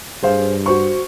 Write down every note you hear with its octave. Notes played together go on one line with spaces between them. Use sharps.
G2 G#4 C5 F5
F#4 C5 C#6